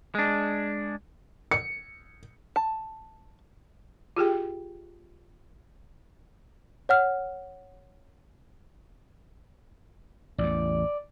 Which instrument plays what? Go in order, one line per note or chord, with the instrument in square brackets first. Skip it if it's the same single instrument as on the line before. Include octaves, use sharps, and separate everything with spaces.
[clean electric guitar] G#3 D4
[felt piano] C#7
[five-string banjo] A5
[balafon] F4 G4 G#4 G5
[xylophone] C#5 F#5 F6
[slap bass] A1 E2 [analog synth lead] D5